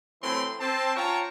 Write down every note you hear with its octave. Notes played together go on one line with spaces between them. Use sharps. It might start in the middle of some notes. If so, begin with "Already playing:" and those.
A2 E3 F#3 C4 B5 C6
C4 A5
C#4 F4 C#5 G5 A5 A#5